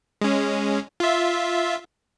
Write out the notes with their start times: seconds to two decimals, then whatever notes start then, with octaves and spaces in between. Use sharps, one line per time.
0.21 G#3 C#4
1.00 F4 E5